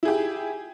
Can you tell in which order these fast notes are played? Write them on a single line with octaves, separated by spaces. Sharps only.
E4 G#4 G4